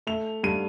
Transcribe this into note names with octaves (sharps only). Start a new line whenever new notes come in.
A3 F7
G2 D#7